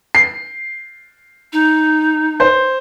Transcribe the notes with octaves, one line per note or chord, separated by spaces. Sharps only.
C7
D#4
C5